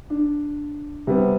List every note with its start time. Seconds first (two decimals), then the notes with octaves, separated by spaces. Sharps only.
0.10 D4
1.07 C3 G3 B3